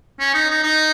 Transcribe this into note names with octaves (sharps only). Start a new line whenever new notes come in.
C#4
D#4
D#4
D#4